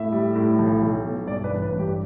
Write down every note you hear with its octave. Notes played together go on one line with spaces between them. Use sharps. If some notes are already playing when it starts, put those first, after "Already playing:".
Already playing: A2 E5
G3
A2
B1
B1
B2
G2 D5
B4
A1
B4
G2
G4